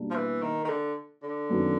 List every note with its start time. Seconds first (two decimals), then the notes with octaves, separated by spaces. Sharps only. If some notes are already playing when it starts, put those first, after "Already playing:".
Already playing: B2 G3 A#3 D4
0.10 F3
0.15 E3
0.42 D#3
0.64 D#3
0.69 D3
1.23 D3
1.50 F#2 D#3 F#3 B3